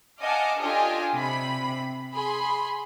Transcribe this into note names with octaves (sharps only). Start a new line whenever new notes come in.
D#5 F5 F#5 G#5 A5 D6
D4 F4 G4 A4 D#5 G#5
C3 B5
G#4 B5 C6